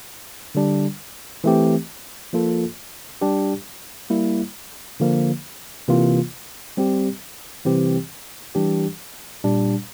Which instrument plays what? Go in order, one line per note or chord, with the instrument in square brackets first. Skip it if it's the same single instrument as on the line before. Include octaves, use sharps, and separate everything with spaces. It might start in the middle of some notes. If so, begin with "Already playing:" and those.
[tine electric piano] D3 G3 D4
E3 A3 C4 G4
F3 A#3 F4 A4
G3 D4 G4
G3 A#3 E4
D3 F3 A#3
C3 E3 A#3 F4
G3 C4 G4
C3 E3 G3 C4 G4
E3 G3 D4 G4
A#2 G3 D4